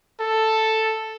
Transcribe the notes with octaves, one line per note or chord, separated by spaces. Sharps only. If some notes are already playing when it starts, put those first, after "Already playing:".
A4